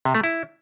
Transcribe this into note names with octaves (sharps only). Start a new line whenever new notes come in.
C3
A3
E4